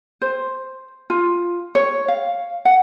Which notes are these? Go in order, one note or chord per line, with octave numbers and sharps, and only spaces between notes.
C5
F4
C#5
F5
F#5